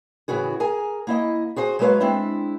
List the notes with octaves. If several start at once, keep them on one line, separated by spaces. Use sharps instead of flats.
A2 C#3 E3 F#4 G#4
G#4 A#4 G#5
A#3 E4 D#5
F#4 G#4 C5 G#5
F#3 G#3 F#4 B4 C#5 F5
G#3 C4 D4 E4